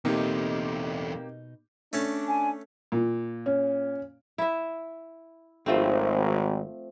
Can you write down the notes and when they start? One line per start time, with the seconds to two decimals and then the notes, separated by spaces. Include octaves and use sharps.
0.05 E2 B2 A3 A#3 C4 D#4 G4
1.93 A3 C#4 D4 A5
2.28 G#5
2.92 A#2
3.46 C#4
4.38 E4 E5
5.66 G#1 F3 A3 C4